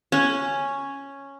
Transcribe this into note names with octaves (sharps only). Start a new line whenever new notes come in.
C#4